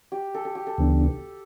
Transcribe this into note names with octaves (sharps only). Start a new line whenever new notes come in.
G4
A4
A4
G4
A4
D2 C#3 E3 B3 D4